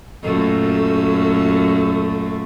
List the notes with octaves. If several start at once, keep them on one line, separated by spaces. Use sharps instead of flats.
F#2 A#2 A3 A4